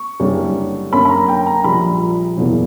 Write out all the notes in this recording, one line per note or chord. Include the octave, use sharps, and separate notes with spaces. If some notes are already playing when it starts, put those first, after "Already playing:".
Already playing: C#6
F#1 F#2 D3 G3 C#4
F#2 D3 A#3 C#4 B5
B5
A#5
G5
A#5
A#1 A#2 G3 B5
F#1 E2 B2 A#3